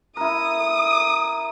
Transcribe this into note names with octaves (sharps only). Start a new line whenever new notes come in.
E4 A#4 D#6